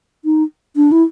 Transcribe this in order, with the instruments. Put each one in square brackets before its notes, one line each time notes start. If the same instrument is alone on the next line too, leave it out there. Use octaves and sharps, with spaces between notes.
[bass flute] D#4
D4
E4